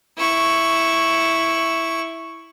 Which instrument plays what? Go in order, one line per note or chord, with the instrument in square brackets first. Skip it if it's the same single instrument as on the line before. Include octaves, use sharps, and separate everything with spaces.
[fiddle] E4 C#6